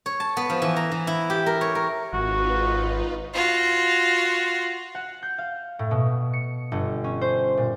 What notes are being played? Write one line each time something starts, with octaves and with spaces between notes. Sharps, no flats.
C#5
A5
B3
F3
E3
A#5
E3
E4
G4
A#4
C#5
A#4
G#1 D#4 F4 F#4 B4
F4 F#4
F#5
G6
F5
A2
B2
C#7
G1
C#4
C5
A#2